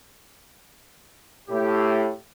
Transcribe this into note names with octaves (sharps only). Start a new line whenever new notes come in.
A2 G4